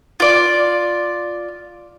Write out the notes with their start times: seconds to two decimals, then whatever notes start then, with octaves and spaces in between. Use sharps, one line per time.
0.20 F4 D5